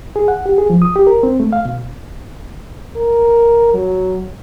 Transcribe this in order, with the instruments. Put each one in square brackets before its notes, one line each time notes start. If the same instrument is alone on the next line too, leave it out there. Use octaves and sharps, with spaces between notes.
[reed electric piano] G#4
F#5
G4
G#4
F3
D#6
G4
A#4
C4
A3
F5
B2
[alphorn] A#4
F#3